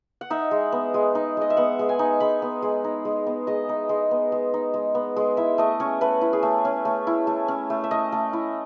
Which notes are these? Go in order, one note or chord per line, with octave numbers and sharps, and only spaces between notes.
F#5
D#4 E5
G#3
B3
G#3
D#4
G#3 D#5
E5
B3 F#5
G#3
G#5
D#4
G#3 B5
B3
G#3
D#4
G#3
B3
G#3 D#5
D#4
G#3
B3
G#3
D#4
G#3
B3
G#3
E4 E5
A3 D#5
C#4 C#5
A3 B4
E4
G#4
A3
C#4
A3
E4
A3
C#4
A3
E5
A3 D#5
A3
E4